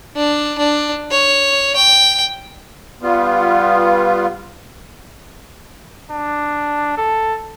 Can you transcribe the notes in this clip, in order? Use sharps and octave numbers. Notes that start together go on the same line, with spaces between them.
D4
D4
C#5
G5
G3 B3 F4
D4
A4